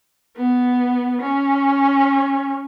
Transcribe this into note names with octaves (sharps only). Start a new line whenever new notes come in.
B3
C#4